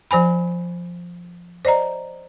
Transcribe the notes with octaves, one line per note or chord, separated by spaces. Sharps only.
F3 C5 G#5 B5
C5 D5 D#5 A#5